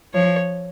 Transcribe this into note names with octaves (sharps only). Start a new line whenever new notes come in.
F3 C#5